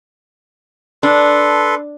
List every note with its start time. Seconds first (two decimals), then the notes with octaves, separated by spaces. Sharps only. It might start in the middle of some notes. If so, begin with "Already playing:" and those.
1.03 D4 A4 B4 C6